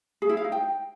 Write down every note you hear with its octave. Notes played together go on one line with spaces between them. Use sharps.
G#4
E4
F5
D#4
G5